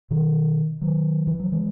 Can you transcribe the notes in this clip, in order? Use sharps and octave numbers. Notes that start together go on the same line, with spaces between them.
B2 D#3
D#3 F#3
E3
F#3
E3 G#3